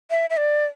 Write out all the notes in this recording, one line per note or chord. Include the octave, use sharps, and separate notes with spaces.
E5
E5
D5